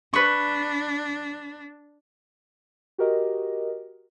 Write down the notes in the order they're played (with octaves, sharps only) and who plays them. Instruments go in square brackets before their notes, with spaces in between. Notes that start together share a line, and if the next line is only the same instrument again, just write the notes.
[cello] D4 [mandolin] B4 C#6
[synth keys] F#4 G4 A#4 D#5